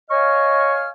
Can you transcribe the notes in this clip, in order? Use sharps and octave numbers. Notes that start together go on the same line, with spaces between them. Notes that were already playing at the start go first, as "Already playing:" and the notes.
C#5 D#5 F5 G#5 C#6 F6